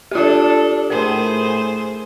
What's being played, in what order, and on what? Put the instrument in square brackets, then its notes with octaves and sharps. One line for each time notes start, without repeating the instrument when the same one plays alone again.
[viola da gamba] D4 A4 [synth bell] F4 G4
[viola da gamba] A2 G#4 C5 [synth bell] A#4